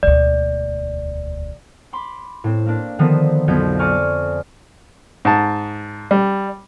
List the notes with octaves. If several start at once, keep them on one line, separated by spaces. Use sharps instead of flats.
E1 D2 D5
B5 C6 D6
A2 C4
A#3 D4
D3 D#3 F3 B3 C4
B1 F2 B3 G6 G#6
D5 G#5 A#5 C#6 D6 F6
G#2 A5
G3